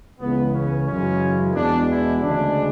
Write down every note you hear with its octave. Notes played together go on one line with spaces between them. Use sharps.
C#2 C#3 E3 G#3 B3
C#4
F#2 C#3 E3 G#3 C#4
E2 B2 G#3 D4
E4
D2 C#3 G#3 D4